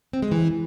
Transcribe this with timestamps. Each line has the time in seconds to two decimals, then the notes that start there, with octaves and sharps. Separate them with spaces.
0.13 C4
0.22 G#3
0.32 E3